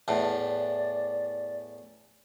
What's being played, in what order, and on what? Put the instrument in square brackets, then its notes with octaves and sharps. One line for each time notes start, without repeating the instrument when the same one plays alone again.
[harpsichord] E2 A2 [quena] D5